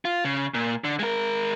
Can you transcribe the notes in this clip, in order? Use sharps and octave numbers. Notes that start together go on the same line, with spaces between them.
F4
C#3
A#2
D3
G#3 A#4